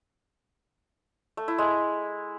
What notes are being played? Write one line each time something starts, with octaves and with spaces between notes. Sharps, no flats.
A3
E4
G#3